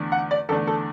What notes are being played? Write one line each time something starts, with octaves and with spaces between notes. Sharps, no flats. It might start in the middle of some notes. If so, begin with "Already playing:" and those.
Already playing: E2 D3 A3 D4
F#5
D5
E2 D3 A3 D4 A4
A4